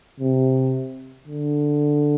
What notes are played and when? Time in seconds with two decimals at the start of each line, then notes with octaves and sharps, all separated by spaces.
0.20 C3
1.27 D3